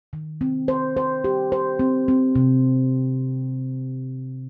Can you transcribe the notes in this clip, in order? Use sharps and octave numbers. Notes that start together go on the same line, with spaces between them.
D#3
C4
C5
C5
G4
C5
C4
C4
C3